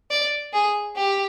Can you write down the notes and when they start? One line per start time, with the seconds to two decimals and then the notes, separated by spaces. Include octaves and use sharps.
0.11 D5
0.53 G#4
0.96 G4